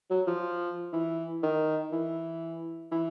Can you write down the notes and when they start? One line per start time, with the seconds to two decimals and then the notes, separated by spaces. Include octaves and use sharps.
0.10 F#3
0.27 F3
0.93 E3
1.43 D#3
1.92 E3
2.91 E3